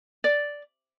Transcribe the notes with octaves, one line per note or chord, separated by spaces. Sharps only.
D5